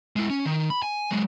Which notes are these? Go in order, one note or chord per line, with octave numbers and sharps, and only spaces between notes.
G#3 E4
C#4
D#3
B5
G#5
F#3 G#3